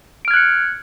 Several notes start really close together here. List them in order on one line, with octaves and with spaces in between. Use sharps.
D7 F6 G#6 F#6 C#7